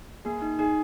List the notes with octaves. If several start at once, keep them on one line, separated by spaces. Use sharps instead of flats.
A#3 G#4
D#4
D#4 G#4